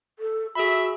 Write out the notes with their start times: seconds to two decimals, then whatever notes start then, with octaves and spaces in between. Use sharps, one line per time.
0.19 A4
0.55 F#4 G#4 E5 B5